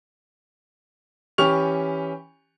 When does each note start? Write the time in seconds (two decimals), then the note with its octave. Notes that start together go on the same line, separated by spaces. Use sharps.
1.38 E3 C#4 G4 C#6 F6 F7